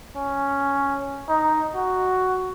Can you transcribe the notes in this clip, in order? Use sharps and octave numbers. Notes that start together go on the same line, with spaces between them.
C#4
D#4
F#4